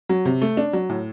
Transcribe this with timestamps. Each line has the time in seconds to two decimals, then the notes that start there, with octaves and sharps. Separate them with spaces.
0.09 F#3
0.25 C3
0.42 A3
0.57 D4
0.73 F#3
0.89 A2